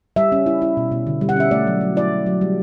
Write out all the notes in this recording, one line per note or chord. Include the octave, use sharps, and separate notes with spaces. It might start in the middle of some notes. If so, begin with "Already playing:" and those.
G3 E5
C#4
E4
E4
B2
B2
D3
G3
F#5
C#4 E5
A3 D5
F#3
F#3
E4 D5
F#3
F#3
G3